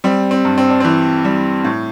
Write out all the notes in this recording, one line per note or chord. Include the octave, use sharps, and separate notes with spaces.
G3 C4
C4
G2
C4
D4
E3 C4
G3
A2